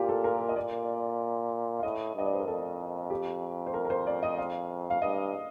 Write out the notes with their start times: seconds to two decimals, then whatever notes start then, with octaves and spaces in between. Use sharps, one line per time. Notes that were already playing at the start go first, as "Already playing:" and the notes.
Already playing: A#2 F4 G4
0.09 A4
0.24 A#4
0.49 D#5
0.56 A#2 D5
1.79 F5
1.83 A2 D#5
2.16 G2 D#5
2.26 D5
2.33 C5
2.40 A#4
2.47 F2 A4
3.10 G4
3.66 C5
3.74 A#4
3.85 A#4
3.90 C5
4.07 D5
4.23 D#5
4.38 F5
4.90 F5
5.02 G2 D#5